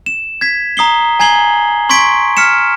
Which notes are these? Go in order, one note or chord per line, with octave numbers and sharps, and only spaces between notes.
E7
G#6 B6
A#5 D#6 C7 G7
G#5 A#5 G#6 C7 F#7 G7
C6 C#6 G#6 B6 D7
F6 B6 C#7 E7